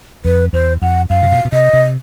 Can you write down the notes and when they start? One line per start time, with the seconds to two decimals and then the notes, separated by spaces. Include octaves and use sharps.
0.25 F2 B4
0.53 E2 C5
0.82 F2 F#5
1.10 F#2 F5
1.23 C3
1.32 B2
1.45 B2
1.52 C3 D#5
1.73 C3